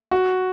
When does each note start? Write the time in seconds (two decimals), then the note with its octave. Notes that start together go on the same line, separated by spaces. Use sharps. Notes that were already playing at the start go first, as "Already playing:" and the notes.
0.11 F#4